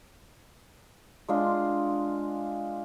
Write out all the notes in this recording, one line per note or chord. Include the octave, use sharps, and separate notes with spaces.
G#3 D4 F4